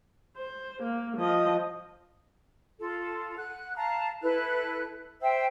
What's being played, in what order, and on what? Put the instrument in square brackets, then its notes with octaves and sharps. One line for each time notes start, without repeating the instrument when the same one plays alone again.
[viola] C5
A#3
F3 D#5
[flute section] F4 A4
F#5 F#6
F5 A5 A#5
E4 A4 B4 F#6
C5 E5 G5 E6